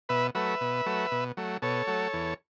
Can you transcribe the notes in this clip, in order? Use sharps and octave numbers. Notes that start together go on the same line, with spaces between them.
B2 B4 E5
F#3 A3 B4 E5
B2
F#3 A3
B2
F#3 A3
B2 A4 C#5
F#3 A3
E2